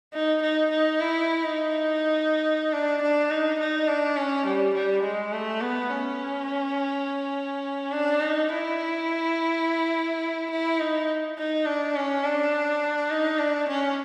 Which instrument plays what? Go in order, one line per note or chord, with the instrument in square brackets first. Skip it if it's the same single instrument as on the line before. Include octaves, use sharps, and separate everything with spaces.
[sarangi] D#4
D#4
D#4
E4
D#4
D4
D4
D#4
D#4
D4
C#4
G3
G3
G#3
A3
B3
C#4
D4
D#4
E4
E4
D#4
D#4
D4
C#4
D4
D#4
D4
C#4